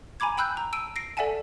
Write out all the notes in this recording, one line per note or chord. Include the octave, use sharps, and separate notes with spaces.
G#5 A#5 B5 D6 G#6
G5 B5 E6 F#6 G6
A#5
A5 E6 D7 D#7
A#6 C7 D7
A4 D5 E5 F#5 G#5 A5